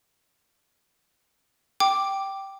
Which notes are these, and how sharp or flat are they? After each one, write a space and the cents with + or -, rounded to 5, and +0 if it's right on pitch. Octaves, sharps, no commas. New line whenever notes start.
G5 -10 D6 +0